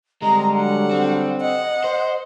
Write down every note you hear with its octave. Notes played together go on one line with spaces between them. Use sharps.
D3 G3 G#3 C4 A#5
F#3 F#5
C4
D#5 F#5
C5